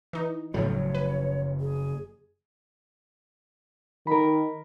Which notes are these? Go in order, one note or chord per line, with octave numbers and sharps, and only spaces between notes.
E3 D#4
F#1 A2 F3 F#3 C#5
B4
G#4
D#3 A#4 B5